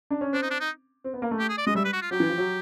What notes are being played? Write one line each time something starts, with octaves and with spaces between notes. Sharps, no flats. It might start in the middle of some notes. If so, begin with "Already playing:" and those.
D4
C#4
C4 D4
D#4
D4
D#4
C4
B3
A#3
A3
G4
G#4
D5
G#3 D#5
G3 E5
B4
F#4
F4
F#3 G4
E3
F3
F#3